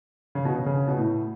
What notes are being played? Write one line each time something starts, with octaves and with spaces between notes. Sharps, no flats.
C#3
B2
C#3
C#3
B2
A2